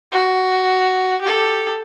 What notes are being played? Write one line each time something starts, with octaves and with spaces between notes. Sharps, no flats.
F#4
G4 A4